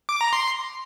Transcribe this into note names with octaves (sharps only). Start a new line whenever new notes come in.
D6
A#5
C6